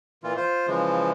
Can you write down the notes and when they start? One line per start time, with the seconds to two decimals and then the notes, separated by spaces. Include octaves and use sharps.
0.24 A#2 E3 F4
0.37 F4 C5
0.68 C#3 E3 F3 G#3